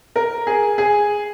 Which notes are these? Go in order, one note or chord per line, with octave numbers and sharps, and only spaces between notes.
A#4
G#4
G#4